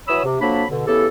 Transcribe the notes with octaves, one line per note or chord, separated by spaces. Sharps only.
E3 F#3 C#5 B5 D#6 E6
C3
F2 F#3 A#3 D4 A5 B5
B2 D3
C#3 E3 B3 E4 G4 A4